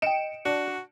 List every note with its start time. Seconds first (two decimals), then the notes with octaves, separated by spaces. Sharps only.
0.02 D#5 G5 C#7 D7 E7
0.45 D4 F#4